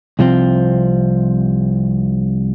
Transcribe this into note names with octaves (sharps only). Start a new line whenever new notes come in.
C2 C3 F3 C4